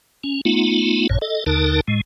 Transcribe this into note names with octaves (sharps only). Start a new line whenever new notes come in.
C#4
A3 B3 D#4 F4
A1 F#2 A#2 C#5
A4 D#5
D#2 D3 D#4 A#4 A5
A2 G#3